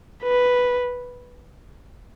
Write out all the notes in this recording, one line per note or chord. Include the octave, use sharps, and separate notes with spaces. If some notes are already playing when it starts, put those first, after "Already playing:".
B4